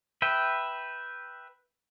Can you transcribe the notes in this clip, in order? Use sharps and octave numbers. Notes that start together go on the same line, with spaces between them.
B4 E5 G5